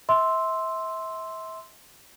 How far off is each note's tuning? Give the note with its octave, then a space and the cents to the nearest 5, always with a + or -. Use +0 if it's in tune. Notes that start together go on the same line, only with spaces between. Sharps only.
E5 -30 C6 +0 E6 -5